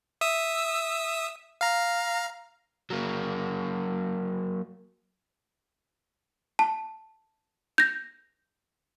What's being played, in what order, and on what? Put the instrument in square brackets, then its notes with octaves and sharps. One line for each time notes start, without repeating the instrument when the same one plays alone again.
[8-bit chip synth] E5 D#6 E6
F5 A#5
[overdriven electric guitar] F#3 A#3
[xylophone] A5
G6 A#6